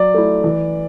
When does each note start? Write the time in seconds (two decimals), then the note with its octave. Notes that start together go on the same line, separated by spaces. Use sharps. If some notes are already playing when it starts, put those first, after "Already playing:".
Already playing: F#3 D5
0.14 A3 E4
0.44 E3